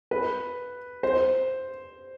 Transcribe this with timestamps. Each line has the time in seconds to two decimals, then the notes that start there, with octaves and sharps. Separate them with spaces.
0.11 B4
1.03 C5